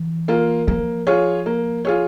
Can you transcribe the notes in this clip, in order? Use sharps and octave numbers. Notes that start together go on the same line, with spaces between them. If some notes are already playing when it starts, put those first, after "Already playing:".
Already playing: E3
A#3 F4
F3 A#3
F4 G#4 C#5
A#3
F4 G#4 C#5